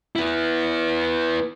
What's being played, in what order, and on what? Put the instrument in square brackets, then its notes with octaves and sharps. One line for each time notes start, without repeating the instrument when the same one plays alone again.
[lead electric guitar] B3 E4